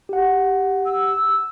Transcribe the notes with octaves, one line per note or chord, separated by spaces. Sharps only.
G4 F#5
E6